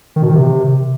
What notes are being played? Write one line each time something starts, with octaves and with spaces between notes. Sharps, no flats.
D#3
B2
D#3
C3